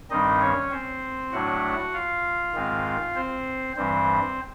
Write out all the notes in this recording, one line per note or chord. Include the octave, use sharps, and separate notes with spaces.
G2 D#3 G3 C4 D#4 D#5
C#4 C#5
C4 C5
A2 F#3 A3 D4 F#4 F#5
F4 F5
G#2 D#3 G#3 C4
C4 C5
G2 E3 G3 C4 C5